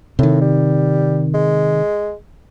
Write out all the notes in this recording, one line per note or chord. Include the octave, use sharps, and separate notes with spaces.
A2 C3 D#3
G3
G#3